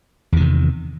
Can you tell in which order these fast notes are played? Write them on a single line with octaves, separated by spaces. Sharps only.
E2 D#3 C3